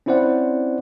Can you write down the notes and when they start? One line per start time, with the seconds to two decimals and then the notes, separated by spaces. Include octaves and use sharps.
0.06 C4 C#4 E4 C5 D5 F#5